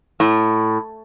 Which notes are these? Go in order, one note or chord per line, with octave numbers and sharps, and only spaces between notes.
A2